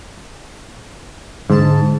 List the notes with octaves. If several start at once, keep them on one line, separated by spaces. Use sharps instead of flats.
G#2 D3 G#3 A5